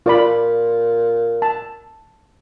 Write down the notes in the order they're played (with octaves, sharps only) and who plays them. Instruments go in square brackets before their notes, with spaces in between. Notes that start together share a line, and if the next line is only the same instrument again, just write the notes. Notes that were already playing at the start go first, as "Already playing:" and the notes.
[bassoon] A#2 [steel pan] F4 D5 B5
[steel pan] A5